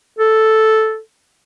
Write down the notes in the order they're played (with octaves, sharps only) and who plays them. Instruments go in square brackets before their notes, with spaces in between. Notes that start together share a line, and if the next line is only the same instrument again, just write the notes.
[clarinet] A4